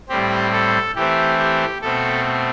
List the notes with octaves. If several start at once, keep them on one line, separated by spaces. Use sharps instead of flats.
A2 G3 C4 G4
A4
E3 A3 C4 G4
G4
B2 A3 C4 A4